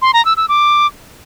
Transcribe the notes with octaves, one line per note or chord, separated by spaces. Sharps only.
C6
A#5
E6
E6
D6